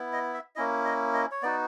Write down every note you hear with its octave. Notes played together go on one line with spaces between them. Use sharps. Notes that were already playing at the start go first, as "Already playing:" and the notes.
Already playing: B3 E4
D#5
E5
A#3 C#4 E4 D#5
D#5
D#5
C#5
B3 D#4 F#4 D5